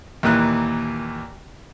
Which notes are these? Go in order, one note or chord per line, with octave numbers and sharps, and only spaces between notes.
D#2 A#2 E3 F#6